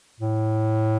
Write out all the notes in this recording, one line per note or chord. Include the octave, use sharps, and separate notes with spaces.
A2